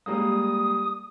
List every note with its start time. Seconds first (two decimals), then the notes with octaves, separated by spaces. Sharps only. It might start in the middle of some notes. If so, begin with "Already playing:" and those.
0.06 G3 G#3 A#3 D#6